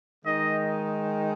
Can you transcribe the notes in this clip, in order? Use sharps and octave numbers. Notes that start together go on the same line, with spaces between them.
D#3 G#3 D#4 D#5